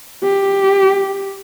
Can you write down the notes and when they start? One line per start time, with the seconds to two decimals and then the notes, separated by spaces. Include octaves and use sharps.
0.24 G4